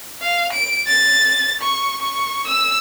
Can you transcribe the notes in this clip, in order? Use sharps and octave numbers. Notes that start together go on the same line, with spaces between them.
F5
D7
A6
C#6
C#6
E6